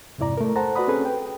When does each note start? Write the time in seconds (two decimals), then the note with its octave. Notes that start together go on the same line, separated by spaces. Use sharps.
0.18 F2 G#2 C3 E4 D5 A#5
0.37 A3 A#4
0.56 A4 C5 F#5 A5 A#5
0.75 F#4 B4 D5 F#5 B5 D#6
0.88 C4 C#4 G#4 A4 B4
1.05 G5